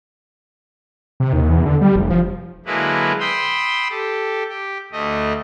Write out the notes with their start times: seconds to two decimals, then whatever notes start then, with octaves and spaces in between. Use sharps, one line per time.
1.20 C3
1.33 D#2
1.49 E2
1.66 D3
1.81 G3
1.96 F1
2.10 F3
2.66 D3 F#3 G#3 A#3 E4 B4
3.20 G5 B5 C6 D#6 E6
3.90 G4 A4
4.48 G4
4.92 D2 A3 D#5